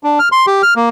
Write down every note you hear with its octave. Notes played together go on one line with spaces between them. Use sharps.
D4
F6
C6
G4
F6
A#3